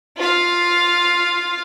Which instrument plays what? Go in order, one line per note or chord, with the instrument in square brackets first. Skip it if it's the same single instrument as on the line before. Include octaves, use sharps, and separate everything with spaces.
[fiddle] F4 F5